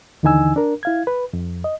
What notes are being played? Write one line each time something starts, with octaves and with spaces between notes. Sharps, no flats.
D#2 D3 E3 D#4 G#5 E6
D4 A#4
E4 F5 G#6
B4
F2
D#5